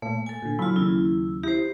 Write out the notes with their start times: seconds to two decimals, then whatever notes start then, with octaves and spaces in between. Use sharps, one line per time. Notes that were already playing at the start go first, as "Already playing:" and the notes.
0.02 A#2 A3
0.26 A4 G#5
0.42 A#2 D3
0.59 F#3 E4 F4 B5
0.76 D#2 C#3 E4
1.43 E4 G4 C5